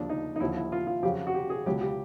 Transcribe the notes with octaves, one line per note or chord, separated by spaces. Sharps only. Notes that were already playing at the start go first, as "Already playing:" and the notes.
Already playing: D#2 C#3 F3 D4
D#4
D#4
D#2 D3 F3 E4
E4
F4
F4
F2 C#3 F#3 G4
F#4
G4
G#4
C#2 B2 F#3 G4
G4